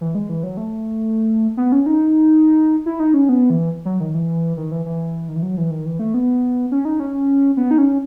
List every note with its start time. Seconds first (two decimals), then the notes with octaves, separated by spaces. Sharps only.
0.01 E3
0.15 G#3
0.29 E3
0.43 F#3
0.57 A3
1.57 B3
1.72 C#4
1.86 D#4
2.86 E4
3.00 D#4
3.14 C#4
3.29 B3
3.50 E3
3.85 F#3
4.00 D#3
4.14 E3
4.57 D#3
4.72 E3
4.85 E3
5.29 D#3
5.36 E3
5.42 F#3
5.57 E3
5.71 D#3
5.86 E3
5.99 A3
6.14 B3
6.71 C#4
6.85 D#4
7.00 C#4
7.57 B3
7.71 D#4
7.78 C#4